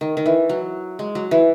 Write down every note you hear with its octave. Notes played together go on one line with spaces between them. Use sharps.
D#3
D#3
E3
F#3
G#3
F#3
E3